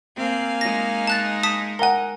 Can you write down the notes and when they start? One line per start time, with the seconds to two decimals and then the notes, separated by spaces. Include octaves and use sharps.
0.16 A#3 C4 F5 G#5
0.61 G#3 D#4 A#6
1.07 A5 F#6 A6
1.43 A5 D#6 B6
1.79 A#4 F#5 G#5 A#5